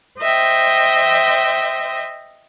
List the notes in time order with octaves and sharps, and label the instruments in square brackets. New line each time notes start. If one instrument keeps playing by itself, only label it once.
[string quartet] C5 D#5 E5 G5